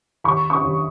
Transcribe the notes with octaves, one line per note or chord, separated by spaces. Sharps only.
D#2 B5 C#6
C#6 D#6
D#2